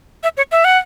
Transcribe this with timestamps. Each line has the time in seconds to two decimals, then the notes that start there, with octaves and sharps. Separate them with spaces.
0.23 E5
0.37 C#5
0.52 E5
0.65 F#5